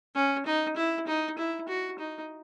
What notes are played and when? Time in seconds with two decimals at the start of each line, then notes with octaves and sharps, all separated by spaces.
0.15 C#4
0.46 D#4
0.77 E4
1.07 D#4
1.38 E4
1.68 F#4
1.99 D#4